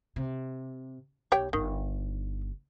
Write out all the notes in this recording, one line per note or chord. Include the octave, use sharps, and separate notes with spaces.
C3
B1 G4 C#5 G5
G1 D#3 D#4